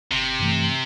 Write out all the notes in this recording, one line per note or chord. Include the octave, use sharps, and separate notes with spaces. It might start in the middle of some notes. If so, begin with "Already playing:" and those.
G1 C3
G2 E3 A3